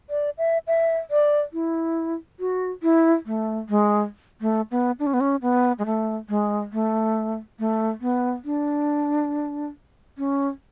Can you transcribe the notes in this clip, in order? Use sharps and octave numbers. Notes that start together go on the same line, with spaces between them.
D5
E5
E5
D5
E4
F#4
E4
A3
G#3
A3
B3
D4
C#4
B3
C#4
B3
G#3
A3
G#3
A3
A3
B3
D4
C#4